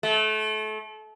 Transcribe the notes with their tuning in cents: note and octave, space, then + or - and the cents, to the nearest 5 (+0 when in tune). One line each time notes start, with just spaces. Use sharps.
A3 -30